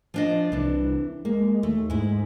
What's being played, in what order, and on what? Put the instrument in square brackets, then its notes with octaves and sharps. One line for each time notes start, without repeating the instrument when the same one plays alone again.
[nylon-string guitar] F3 D4 D#5
[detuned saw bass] C2 [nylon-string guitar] E3 D4
[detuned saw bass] G#3 [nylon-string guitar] A#3
[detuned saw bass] D#2 [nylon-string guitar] A3
[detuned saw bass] G#2 [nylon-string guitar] G#3 E4